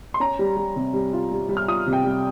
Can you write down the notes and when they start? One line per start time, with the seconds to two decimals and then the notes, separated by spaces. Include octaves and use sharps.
0.14 C6
0.20 C#4 A#5
0.39 G3
0.57 G3
0.76 C3
0.94 G3
1.13 F4
1.32 G3
1.49 G3
1.57 F6
1.68 F4 D#6
1.87 C3
1.93 G5
2.04 G3